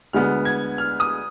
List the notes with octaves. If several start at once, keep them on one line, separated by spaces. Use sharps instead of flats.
D2 D3 G#3 B3 F6
G#6
F6
D#6